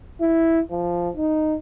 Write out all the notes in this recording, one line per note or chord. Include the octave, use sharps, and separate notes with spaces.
E4
F3
D#4